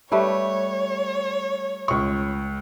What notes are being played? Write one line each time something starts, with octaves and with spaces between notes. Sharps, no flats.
G3 A3 B4 C#5
C#2 C#6